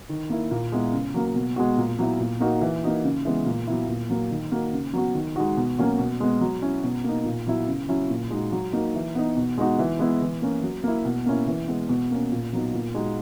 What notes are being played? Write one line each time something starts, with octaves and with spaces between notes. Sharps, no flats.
D#3
A#3 E4
A#2
G#3 B3 E4
C#3
F#3 A#3
B2
G#3 B3 F#4
A#2
F#3 B3 E4
A#2
A#3 D#4 F#4
E3
A#3 D#4 F#4
C#3
E3 G#3 B3
A#2
F#3 B3 E4
A#2
F#3 A#3
D#3
A#3 D#4 F#4
C#3
F#3 B3 F#4
D#3
G#3 D#4 F#4
B2
F#3 A#3 C#4 F#4
B2
G#3 B3
F#3
C#4 E4
B2
A#3 D#4
A#2
F#3 B3 E4
C#3
F#3 C#4 E4
A#2
G#3 D#4 F#4
F#3
A#3 D#4 F#4
E3
B3 D#4
B2
G#3 B3 D#4 F#4
E3
G#3 B3 E4
E3
A#3 C#4
F#3
A#3 E4
B2
A#3 C#4 E4
E3
G#3 B3
B2
A#3 C#4
A#2
F#3 B3 D#4
A#2
G#3 D#4 F#4